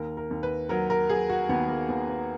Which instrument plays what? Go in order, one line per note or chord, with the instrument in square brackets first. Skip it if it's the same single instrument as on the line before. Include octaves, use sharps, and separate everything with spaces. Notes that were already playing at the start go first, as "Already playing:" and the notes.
Already playing: [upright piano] D#2 A#4
A#4
D#2
B4
F#3 A#4
A#4
F#3 G#4
F#4
D#2 B3
A#3
D#2 B3
B3